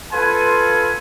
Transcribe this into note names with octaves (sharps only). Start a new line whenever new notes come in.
F4 A4 B4 G#5 C6